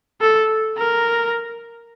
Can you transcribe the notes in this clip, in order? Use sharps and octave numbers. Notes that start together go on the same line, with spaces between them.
A4
A#4